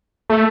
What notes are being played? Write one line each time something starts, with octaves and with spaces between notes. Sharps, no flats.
A3